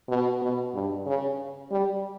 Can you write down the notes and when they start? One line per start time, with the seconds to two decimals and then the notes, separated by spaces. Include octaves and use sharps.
0.09 B2
0.42 B2
0.75 G2
1.06 C#3
1.71 G3